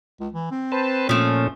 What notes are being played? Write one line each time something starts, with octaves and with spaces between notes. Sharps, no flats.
C#2
E3
C4
B4 C5 A5
A#2 F3 A3 C#4